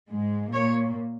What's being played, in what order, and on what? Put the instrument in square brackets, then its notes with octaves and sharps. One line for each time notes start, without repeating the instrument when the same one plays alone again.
[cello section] G#2 G#3
A#2 A#3 C#5